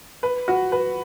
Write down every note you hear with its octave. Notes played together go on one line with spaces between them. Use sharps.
B4
F#4
B4